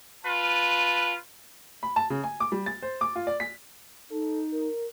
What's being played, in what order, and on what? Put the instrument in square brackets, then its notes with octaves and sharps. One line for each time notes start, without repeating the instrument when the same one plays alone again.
[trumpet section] F4 B4 A5
[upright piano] B5
A5
C#3
G#5
D6
G3
A6
C5
D6
F4
D5
B6
[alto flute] D#4 [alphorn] A4
[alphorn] A#4